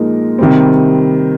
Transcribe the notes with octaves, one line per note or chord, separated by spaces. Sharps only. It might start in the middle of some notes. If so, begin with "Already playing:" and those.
Already playing: A#2 F3 G#3 D#4 A#4
C3 D#3 G3 C4